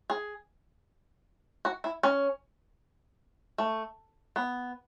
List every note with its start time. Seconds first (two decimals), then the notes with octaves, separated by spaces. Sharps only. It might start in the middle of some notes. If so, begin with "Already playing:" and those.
0.10 G#4
1.65 F#4
1.84 E4
2.03 C#4
3.58 A3
4.36 B3